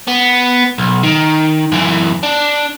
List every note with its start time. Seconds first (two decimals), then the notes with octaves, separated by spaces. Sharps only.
0.08 B3
0.78 B1
1.03 D#3
1.72 F#2 E3
2.23 D4